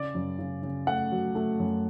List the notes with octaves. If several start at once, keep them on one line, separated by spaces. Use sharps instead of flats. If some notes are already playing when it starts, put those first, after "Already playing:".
Already playing: C#3 D5
F#2
C#3
C#3
A3 F#5
F#3
A3
F#2